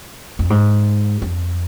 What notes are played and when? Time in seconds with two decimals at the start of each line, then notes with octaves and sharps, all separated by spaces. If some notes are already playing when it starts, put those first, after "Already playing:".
0.39 F2
0.50 G#2
1.22 F2